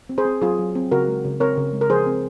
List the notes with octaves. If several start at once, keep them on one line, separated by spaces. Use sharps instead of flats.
C4
G#4 C5
C4
F#3 F4 G#4
F#3
C4
C#3 F#4 A#4
G#3
C#3
C4 A#4 C#5
C#3
G#3
A#4
F3 G#4 C5
C4